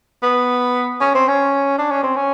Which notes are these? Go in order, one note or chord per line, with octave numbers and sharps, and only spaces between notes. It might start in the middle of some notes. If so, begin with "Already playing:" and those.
B3
C#4
C4
C#4
D4
C#4
C4
C#4